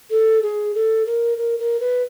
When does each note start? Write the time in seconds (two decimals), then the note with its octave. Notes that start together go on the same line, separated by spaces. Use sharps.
0.10 A4
0.42 G#4
0.75 A4
1.06 A#4
1.38 A#4
1.59 A#4
1.80 B4